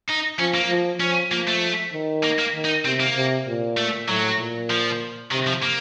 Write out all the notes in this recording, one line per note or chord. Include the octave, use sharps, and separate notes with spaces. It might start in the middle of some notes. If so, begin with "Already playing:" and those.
D#4
F3 C#4
A#3
F3
F3 C#4
F3 A#3
A3
D#3
A#3
A#3
D#3
D#4
C3 C4
A#3
C3
A#2
A3
A2 F#3
A#2
F3
C3 D#3
F3
A#3